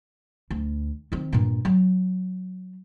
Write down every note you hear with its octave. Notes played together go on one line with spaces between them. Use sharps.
D2
D#3 C4
G2 A#2
F#3